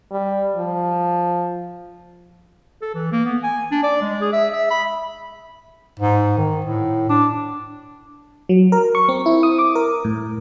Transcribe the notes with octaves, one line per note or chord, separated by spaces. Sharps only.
G3
F3
A4
E3
A#3
B3
G#5
D4
D5
G#3
G#4
E5
E5
B5
G#2
D#3
A2
D4
F#3
A#4
C#6
C4
E4
D#6
D6
A#4
A2